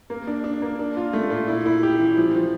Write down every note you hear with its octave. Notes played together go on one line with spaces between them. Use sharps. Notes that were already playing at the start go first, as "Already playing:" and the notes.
A#3
D4
D4
A#3
D4
F4
A3
A#2
E4
E4
G4
E3
F3
F3